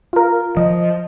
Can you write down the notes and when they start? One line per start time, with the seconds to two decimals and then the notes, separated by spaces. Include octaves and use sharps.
0.13 F4 A#4
0.57 F3 D#5